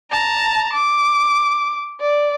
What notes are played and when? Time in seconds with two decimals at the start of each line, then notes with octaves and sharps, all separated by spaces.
0.11 A5 A#5
0.73 D6
2.00 D5